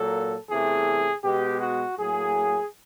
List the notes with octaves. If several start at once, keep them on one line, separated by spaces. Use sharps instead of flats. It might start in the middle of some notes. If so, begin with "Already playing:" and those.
Already playing: A#2 F#3 A#3 A4
E2 C3 E3 A3 G#4
B2 G#3 B3 G4
F#4
A2 F#3 A#3 G#4